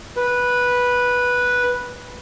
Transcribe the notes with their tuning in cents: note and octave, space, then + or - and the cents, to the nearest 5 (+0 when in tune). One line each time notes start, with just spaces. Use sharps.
B4 -10